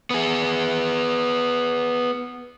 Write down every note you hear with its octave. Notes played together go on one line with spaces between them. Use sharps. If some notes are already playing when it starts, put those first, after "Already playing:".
B3 G#4